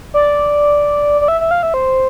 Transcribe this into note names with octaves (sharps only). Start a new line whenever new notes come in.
D5
D5
E5
E5
F5
E5
C5